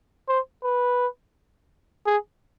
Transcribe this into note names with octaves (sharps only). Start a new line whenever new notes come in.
C5
B4
G#4